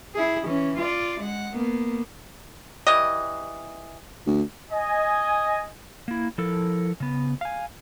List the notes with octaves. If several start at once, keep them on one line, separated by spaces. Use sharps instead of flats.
E4 G#4
E3 C#4
F4 D5
G#3 F#5
A#3 B3
E3 G3 D#5
D2
D#5 G#5
A#3 E4
F3 E4 A4 A#4
C#3 B3
F5 G#5